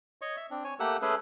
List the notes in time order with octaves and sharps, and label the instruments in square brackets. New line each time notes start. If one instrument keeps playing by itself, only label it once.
[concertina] C#5 D#5 C#6
E5
C4 D4
C#5 G#5
A3 A#3 G4 A4 F#5 E6
A3 C#4 G#4 A4 B4